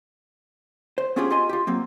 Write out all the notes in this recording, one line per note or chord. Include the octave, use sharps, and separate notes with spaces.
C5
B3 C#4 D4 F4 G4 G#4
F4 G4 D#5 G#5 C6
F4 G4
F#3 A#3 C4